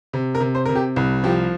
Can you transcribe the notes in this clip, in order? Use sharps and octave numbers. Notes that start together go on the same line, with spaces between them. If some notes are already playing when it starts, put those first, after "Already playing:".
C3
A#4
C3
C5
C3 A#4
G4
C2
F3 G4